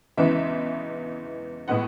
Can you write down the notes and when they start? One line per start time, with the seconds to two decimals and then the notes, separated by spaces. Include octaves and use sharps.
0.17 E2 C#3 E3 G#3 E5
1.68 A2 G#3 B3 F#5